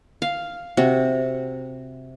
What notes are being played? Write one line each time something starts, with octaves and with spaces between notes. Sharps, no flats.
F5
C3 F#4